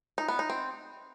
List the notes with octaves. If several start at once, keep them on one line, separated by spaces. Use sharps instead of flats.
D#4
B3
D#4
C4